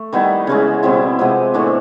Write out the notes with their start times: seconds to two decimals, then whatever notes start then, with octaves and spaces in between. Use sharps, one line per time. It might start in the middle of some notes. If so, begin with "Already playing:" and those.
Already playing: A3
0.13 D#3 G3 B3 E4
0.47 C#3 E3 G#3 C#4
0.83 B2 G3 C4 E4
1.19 C3 F3 G#3 B3
1.54 A2 E3 A3 D4